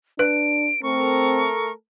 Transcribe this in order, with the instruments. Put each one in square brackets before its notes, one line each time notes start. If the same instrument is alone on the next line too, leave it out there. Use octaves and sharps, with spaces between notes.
[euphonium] D4 [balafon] B4 [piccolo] D7
[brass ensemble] A3 A4 A#4 [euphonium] C4 [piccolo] C#6